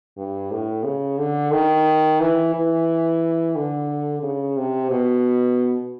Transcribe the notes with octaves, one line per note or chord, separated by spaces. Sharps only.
G2
A2
C#3
D3
D#3
E3
E3
D3
C#3
C3
B2